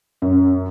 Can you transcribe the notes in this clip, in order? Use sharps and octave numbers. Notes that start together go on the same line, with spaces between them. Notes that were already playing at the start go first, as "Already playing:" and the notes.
F#2